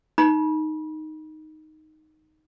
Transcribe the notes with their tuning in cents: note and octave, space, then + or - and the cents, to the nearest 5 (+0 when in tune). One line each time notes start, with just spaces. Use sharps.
D#4 +0 B5 -35